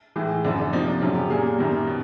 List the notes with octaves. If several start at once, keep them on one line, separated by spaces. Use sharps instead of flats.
A2 E3 G#3
F#2 D3 F3 A3 D4
D4
C3 F3 A#3 D#4
D4
F#2 C#3 F#3 D4
G4
A#2 G3 A#3 G#4
F#2 D#3 G3 A#3
B2